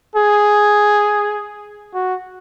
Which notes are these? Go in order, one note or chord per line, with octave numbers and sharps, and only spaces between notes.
G#4
F#4